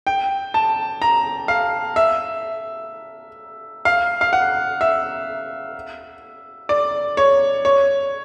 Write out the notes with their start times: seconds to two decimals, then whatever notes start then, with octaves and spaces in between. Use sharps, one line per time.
0.07 G5
0.54 A5
1.02 A#5
1.48 F5
1.96 E5
3.85 F5
4.21 F5
4.33 F#5
4.81 E5
6.69 D5
7.17 C#5
7.65 C#5